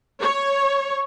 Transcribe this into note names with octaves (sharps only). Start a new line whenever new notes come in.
C#5